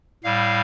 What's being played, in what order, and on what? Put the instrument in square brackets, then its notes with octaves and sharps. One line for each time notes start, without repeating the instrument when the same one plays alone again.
[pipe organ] A2 G3 F5